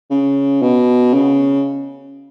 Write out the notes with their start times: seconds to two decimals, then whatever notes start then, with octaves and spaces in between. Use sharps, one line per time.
0.10 C#3
0.62 B2
1.14 C#3